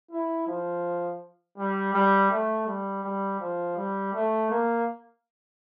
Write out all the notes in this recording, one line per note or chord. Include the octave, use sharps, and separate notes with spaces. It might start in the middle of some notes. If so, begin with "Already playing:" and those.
E4
F3
G3
G3
A3
G3
G3
F3
G3
A3
A#3